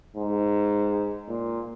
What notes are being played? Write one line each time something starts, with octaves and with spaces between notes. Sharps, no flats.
G#2
A#2